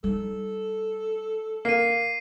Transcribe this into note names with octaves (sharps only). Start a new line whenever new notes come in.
G3 D#4 A4
A#3 C7 D#7